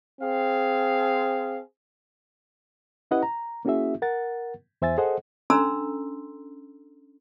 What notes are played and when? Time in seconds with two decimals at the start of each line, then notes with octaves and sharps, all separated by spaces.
0.21 C4 G#4 F5
3.11 C#4 E4 G4 B4 D#5 F#5
3.23 A#5
3.65 A#3 C#4 E4 F#4 G#4 E5
4.02 A#4 F#5 A6
4.82 E2 C5 E5 G#5 A6
4.98 G#4 A4 C5 D#5 F#5
5.50 C#4 D4 A4 A#5 C6 E6